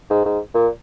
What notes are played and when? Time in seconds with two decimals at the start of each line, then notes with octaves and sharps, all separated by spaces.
0.10 G#2
0.25 G#2
0.54 A#2